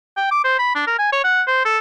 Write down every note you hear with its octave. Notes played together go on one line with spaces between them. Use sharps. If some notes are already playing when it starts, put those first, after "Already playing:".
G5
D6
C5
B5
D4
A#4
G#5
C#5
F#5
C5
A4